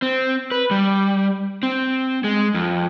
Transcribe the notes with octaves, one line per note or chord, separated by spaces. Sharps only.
C4
B4
G3
C4
G#3
F2